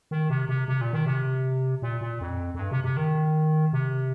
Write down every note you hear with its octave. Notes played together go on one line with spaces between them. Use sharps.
D#3
C3
C3
C3
A#2
D#3
C3
A#2
A#2
F2
F2
G2
C3
C3
D#3
C3